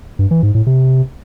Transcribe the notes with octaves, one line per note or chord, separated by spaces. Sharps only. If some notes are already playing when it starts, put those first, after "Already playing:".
G2
E3
G#2
A2
C3